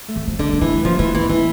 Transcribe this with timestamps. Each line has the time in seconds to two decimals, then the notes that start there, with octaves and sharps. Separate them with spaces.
0.08 A3
0.16 E3
0.28 F3
0.39 D3 G3
0.53 A#3
0.61 E3 A3
0.84 F3 A#3
0.99 E3 A3
1.15 E3 A#3
1.29 E3 A3